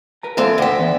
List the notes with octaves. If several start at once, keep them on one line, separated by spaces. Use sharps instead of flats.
A#4 B4 A#5
E3 G#3 C4 A4 D5 F5
D2 D#5 E5 G5
E3 B3